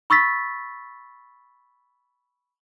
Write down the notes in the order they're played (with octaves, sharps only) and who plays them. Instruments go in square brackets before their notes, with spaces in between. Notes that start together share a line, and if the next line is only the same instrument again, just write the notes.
[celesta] B5 C#6 E6 A6 B6